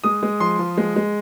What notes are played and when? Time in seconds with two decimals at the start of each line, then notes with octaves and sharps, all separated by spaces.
0.04 G#3 D#6
0.23 G#3
0.40 F3 C6
0.59 F3
0.77 G#3
0.96 G#3